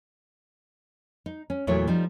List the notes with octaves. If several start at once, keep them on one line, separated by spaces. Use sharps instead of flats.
D#4
C#4
E2 A#2 F#3 A3 E4 C#5
F3 G3 D#4